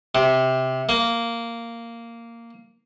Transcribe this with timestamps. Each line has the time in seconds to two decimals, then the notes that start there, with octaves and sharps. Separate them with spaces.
0.15 C3
0.89 A#3